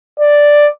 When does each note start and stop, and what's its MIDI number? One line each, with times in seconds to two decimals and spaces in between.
0.19 0.68 74